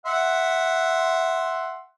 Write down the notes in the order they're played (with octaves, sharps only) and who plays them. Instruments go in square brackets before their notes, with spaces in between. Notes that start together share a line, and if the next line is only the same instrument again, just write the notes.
[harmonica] E5 F#5 C6